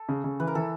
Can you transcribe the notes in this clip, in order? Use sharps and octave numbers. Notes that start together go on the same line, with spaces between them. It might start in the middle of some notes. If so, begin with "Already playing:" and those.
Already playing: A4
C#3
C#3
E3 B4
A#4
E3 A4